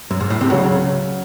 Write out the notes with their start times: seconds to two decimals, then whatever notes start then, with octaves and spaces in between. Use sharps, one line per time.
0.11 F#2
0.20 G#2
0.30 A2
0.41 C3
0.50 C#2 C#3 F#3 C#4 F#4